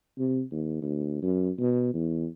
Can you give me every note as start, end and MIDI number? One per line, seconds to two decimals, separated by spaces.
0.18 0.42 48
0.51 0.78 39
0.82 1.22 38
1.22 1.50 42
1.58 1.91 47
1.94 2.27 40